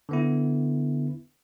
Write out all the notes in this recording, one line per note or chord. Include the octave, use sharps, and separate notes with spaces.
D3 B3 E4